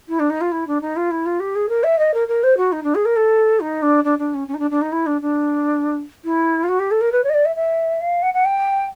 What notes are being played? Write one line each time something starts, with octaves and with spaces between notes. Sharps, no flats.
E4
D4
D#4
F4
E4
D4
D#4
F4
E4
F4
G4
G#4
A#4
E5
D#5
A#4
A#4
C5
F#4
D#4
D4
G#4
A#4
A4
D#4
D4
D4
D4
C#4
C#4
D#4
D4
D4
D#4
E4
D4
D4
E4
F4
F#4
G4
A4
A#4
B4
C#5
D#5
D5
E5
E5
F5
F#5
F#5
G5